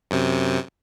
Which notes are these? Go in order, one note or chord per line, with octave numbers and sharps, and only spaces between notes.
F#2 C3